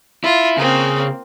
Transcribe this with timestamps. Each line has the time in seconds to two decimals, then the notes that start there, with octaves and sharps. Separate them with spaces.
0.24 E4 F4
0.57 C#3 A#3 C4